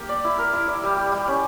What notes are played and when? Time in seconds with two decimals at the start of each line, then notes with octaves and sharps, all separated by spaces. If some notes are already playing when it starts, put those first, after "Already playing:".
Already playing: A#3 G4
0.09 D5
0.24 E4
0.38 A#4
0.53 E4
0.68 D5
0.83 G3
0.97 G4
1.12 G3
1.28 C#4